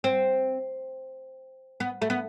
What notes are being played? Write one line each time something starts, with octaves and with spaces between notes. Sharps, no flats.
C4
B3
A3
B3